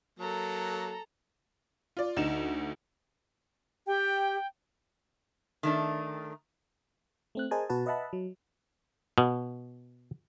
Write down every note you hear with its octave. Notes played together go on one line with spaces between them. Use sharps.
F#3 A#3 A4 A#5
F4 D5
D2 D#4 E7
G4 G5
D#3 A3 D4
A3 C4 F#6
G#4 A#4 C5 D#5 G#5 A5
B2 F#4 B4 A5
B4 D#5 E5 F#5 A5 B5
F#3
B2